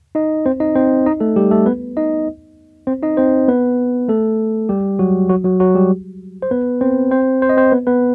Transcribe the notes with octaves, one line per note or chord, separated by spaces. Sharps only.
D#4 D#5
C4 C5
D#4 D#5
C4 C5
D#4 D#5
A3 A4
G3 G4
A3 A4
B3 B4
D#4 D#5
C4 C5
D#4 D#5
C4 C5
B3 B4
A3 A4
G3 G4
F#3 F#4
F#3 F#4
F#3 F#4
F#3 F#4
G3 G4
C5
B3 B4
C4 C5
C4 C5
C5
D#5
C4 C5
B3 B4
B3 B4